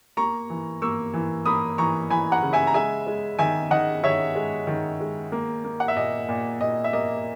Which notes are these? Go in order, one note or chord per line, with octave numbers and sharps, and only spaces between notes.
A#3 A#5 C#6
E3
A#3 C#6 E6
E3
A#3 B5 D#6
E3 A#5 C#6
E3 G#5 B5
F#5 A#5
C#3
E5 G#5
A#5
G#3 E5 G#5
G#3
D#3 E5 G#5
D#3 D#5 F#5
D#3 C#5 E5
G#3
D#3
G#3
A#3
A#3
F#5
E5
A#2 D#5
A#2
A#2 D#5
E5
A#3 D#5